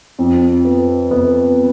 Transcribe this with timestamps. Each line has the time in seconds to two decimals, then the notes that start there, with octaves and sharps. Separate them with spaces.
0.19 F2
0.65 B3
1.11 B3